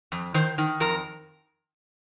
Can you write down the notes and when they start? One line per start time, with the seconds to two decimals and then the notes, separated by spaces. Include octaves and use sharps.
0.12 F2
0.34 D#3 C5
0.58 D#3
0.80 F2 A#4